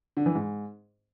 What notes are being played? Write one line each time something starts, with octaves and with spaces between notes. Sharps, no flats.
D3
E3
G#2